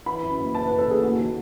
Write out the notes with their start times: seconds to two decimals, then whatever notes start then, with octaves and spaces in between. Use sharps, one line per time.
0.06 E3 B5
0.22 F#2
0.39 F#1
0.54 E3 A5
0.67 B4
0.71 F#2
0.79 A4
0.87 F#1 G#4
1.03 D#2 F#4
1.19 D#3